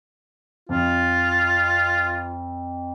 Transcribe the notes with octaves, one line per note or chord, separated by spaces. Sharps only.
F2 F4